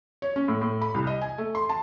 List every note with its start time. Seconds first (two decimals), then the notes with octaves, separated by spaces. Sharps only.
0.22 C#5
0.36 C#4
0.48 A2
0.62 A2
0.82 B5
0.94 C2
1.07 D#5
1.21 G#5
1.38 A3
1.55 C6
1.69 A5